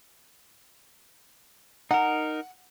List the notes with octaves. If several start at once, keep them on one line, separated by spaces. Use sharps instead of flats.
D#4 A#4 F#5